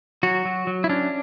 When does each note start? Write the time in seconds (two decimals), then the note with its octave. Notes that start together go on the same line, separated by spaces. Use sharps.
0.23 F#3 F#4
0.45 F#3
0.67 F#3
0.84 E4
0.89 C#4 D4